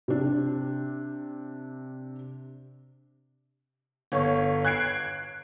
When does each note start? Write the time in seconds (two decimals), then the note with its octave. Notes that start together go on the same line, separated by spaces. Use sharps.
0.08 C3 D4
4.12 G1 C#5
4.65 F#6 G#6 C7 D7